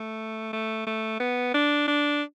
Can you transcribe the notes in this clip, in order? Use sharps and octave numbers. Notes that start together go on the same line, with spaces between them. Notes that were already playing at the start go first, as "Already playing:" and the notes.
Already playing: A3
A3
A3
B3
D4
D4